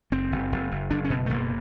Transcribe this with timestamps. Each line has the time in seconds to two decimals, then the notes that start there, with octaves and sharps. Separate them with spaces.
0.12 F#1 C4
0.32 F#1
0.52 F#1
0.71 F#1
0.90 F#1 D4
1.04 C#4
1.10 B2
1.26 A3
1.30 F#1 A#3